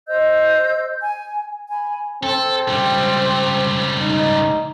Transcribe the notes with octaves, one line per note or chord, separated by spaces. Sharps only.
C5 D#5 E6 G6
G#5
G#5 B5
C4 A4
C#2 G3
D#4